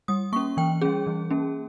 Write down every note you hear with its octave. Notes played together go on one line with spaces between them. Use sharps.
G3 D#6
A#3 C#4 C#6
E3 G5
G3 C#4 G#4
E3
A#3 C#4